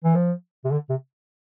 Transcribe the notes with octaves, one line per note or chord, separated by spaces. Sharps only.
E3
F3
C3
D3
C3